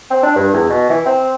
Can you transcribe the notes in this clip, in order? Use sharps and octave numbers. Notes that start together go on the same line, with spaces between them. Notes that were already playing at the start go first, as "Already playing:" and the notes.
C4
D4
G2
E2
B2
E3
C4